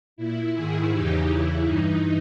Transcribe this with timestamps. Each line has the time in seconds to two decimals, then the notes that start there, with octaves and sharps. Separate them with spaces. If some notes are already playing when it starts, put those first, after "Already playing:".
0.16 A#2 E4
0.54 G#2 D#3 E4 G#4
0.91 E2 C#3 E3 D#4 G4
1.28 E2 C#3 E3 E4
1.65 G2 E3 D#4